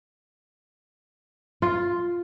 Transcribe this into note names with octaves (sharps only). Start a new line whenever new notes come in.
F4